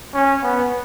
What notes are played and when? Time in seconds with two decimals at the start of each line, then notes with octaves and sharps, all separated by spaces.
0.14 C#4
0.43 B3